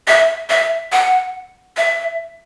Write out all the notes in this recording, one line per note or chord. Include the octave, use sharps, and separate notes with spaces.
E5
E5
F#5
E5